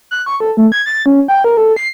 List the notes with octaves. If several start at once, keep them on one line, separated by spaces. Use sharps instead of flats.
F#6
C#6
A4
A3
G#6
A6
C#4
G5
A#4
A4
C7